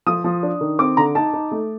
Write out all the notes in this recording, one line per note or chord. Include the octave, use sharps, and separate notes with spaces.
F3 D#6
F3
D4
D#3
C4 D6
D3 A#5
D#4 A5
D#4
A3